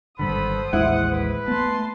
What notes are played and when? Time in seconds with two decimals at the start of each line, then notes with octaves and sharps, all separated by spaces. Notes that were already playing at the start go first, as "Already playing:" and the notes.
0.19 G#1 G2 D3 B3 A4 C5 B5 D#6
0.73 A1 D#2 G#3 E4 F#5
1.13 B4
1.48 A3 B3 A5 C6